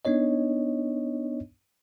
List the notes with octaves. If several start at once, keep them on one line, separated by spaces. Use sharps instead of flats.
B3 D4 D#4 C#5 D#5